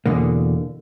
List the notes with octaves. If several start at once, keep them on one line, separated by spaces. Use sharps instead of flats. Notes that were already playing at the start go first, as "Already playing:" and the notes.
E2 B2 D3 A#3